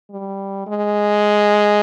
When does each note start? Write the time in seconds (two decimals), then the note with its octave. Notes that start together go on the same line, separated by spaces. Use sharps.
0.11 G3
0.67 G#3